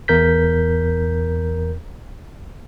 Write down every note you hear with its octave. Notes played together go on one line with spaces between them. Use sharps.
E2 A#4 G6 B6